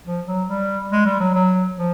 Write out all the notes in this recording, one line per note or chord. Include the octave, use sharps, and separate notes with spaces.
F3
F#3
G3
G#3
G3
F#3
F#3
F3